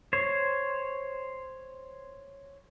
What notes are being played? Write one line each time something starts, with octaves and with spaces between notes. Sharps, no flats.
C5 C#5